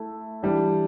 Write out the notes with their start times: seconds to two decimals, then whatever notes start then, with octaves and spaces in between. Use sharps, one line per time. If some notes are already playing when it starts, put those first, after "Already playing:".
Already playing: A3 E4 A4
0.43 E3 G3 D4